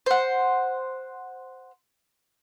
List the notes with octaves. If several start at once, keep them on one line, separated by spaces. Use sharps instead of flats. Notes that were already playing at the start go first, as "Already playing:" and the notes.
C5 F#5